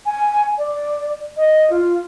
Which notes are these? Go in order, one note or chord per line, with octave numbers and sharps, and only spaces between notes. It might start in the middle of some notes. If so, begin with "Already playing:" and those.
G#5
D5
D#5
F4